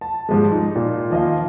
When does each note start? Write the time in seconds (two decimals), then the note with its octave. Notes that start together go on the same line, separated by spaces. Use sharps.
0.01 A5
0.29 G#2 F3 G3 G#3
0.52 D#4
0.75 A#2 F4
1.10 D#3 F3 D#5 F5